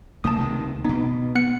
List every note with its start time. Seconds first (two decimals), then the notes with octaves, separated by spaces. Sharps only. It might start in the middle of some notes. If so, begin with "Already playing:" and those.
0.24 B1 A3 A#3 A5 D#6
0.37 C#2 C3 D#3
0.85 B2 B3 D#4
1.35 B3 F#6 C#7